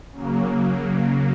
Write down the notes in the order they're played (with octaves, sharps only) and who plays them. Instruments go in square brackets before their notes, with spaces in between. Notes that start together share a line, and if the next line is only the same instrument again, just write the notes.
[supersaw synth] C#3 F#3 A#3